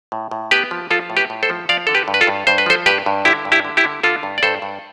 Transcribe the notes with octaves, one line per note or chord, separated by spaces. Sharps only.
A2
A2
B3 G4 B4
F3
F3 F4 A4
A2
G4 B4
A2
A4 C5
F3
F3 D5 F5
D3 A4
G4 B4
G2
B4
F4 A4
G2
G2 C5
B4
F3 A4 C5
G2 G4 B4
G2
D3 E4 G4
G2
E4 G4
D3
E4 G4
D3
D3 F4 A4
G2
D5
G2 A4 C5
G2